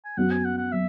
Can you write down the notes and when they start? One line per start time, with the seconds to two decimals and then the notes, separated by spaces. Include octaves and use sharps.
0.05 G#5
0.17 F#2 F#3 B3 F#4 F#5
0.31 G#5
0.45 F#5
0.58 F#5
0.72 F#3 E5